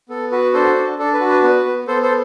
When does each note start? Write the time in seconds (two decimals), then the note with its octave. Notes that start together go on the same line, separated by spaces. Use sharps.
0.09 B3 A4
0.32 F#4 B4
0.54 D4 A4 C5
0.76 D4
0.98 D4 A4
1.14 B4
1.20 F#4
1.28 B4
1.43 B3 B4
1.66 B3
1.88 B3 A4 C5
2.02 A4 C5